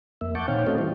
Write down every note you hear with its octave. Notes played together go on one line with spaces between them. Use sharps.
F2 A#3 E5
F#5 A5 C#6 D6 G6
A#2 D#3 C4 C#5 F5 G5
A3 C#4 F#4 A4 C5 D#5
E3 G3 E4